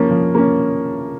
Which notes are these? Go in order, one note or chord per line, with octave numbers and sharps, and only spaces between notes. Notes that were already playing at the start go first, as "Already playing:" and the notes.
Already playing: F3 A#3 C#4
F3
A#3 C#4